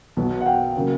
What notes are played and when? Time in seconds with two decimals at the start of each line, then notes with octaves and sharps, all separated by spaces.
0.17 B1 B2 F#3 B3
0.41 F#5
0.46 F5 G5
0.77 C#3 F#3 A#3